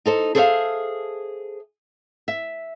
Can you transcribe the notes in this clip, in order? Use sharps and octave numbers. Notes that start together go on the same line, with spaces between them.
D#4 A4 C5
G#4 A4 C5 D5 E5 F5
E5